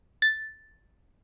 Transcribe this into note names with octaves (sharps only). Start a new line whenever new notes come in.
A6